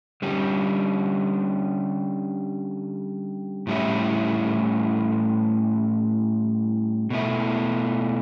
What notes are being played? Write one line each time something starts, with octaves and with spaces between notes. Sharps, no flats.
D3 G3 C#4
A2 G3 C#4 E4
B2 A3 E4